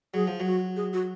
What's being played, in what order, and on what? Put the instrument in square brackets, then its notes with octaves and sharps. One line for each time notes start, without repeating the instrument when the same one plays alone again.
[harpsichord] F#3 [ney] G#4
[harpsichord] F3
F#3
[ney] F#4
G#4
F#4